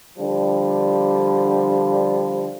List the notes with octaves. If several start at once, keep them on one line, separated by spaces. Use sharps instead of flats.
D3 F3 G3